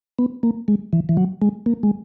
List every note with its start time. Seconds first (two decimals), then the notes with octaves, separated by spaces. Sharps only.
0.19 B3
0.43 A#3
0.68 G#3
0.93 E3
1.09 E3
1.17 F#3
1.42 G#3
1.66 A#3
1.83 G#3